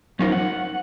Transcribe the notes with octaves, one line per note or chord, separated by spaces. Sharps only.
F#3 C#4 D#4 F4 A#4 C5
F#5